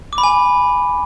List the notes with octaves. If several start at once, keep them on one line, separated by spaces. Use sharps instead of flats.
D6
B5
G#5